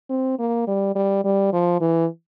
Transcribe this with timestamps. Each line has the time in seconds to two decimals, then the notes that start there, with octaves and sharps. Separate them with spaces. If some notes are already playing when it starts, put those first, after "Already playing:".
0.10 C4
0.39 A#3
0.67 G3
0.96 G3
1.24 G3
1.53 F3
1.81 E3